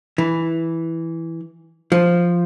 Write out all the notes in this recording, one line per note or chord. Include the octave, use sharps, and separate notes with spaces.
E3
F3